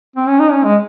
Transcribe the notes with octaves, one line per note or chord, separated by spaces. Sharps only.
C4
C#4
D#4
C#4
G#3